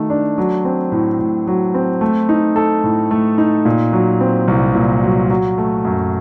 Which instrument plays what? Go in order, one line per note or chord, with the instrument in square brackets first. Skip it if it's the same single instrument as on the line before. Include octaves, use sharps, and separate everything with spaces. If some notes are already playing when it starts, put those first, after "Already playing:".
Already playing: [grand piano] D#3 A3 F#4
D4
F#3
C4
A2
A2
F#3
C4
A3
D#4
A4
A2
A3
D#4
A#2
F#3
C4
C2
A#2
F#3
F#3
A3
F#2